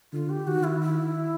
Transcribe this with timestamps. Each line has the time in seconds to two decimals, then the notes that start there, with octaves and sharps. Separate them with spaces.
0.13 D3 F4
0.30 G4
0.47 D#3 F#4
0.64 E4
0.81 E4